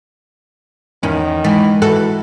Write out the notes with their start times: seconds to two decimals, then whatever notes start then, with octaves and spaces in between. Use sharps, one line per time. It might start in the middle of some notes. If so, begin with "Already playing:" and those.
1.03 E2 D#3 C#4
1.44 E3 G#3
1.82 E3 F#4 A4